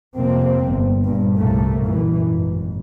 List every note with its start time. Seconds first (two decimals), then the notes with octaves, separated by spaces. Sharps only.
0.16 F2 C3 A#3 C4
0.67 G1
1.04 G2 A#2
1.36 C2 A2 C3 A3 A#3
1.85 F#2 A#2 E3
2.27 G#1